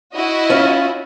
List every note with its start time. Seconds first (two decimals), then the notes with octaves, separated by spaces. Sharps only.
0.15 E4 F#4 D#5
0.49 C#4 F4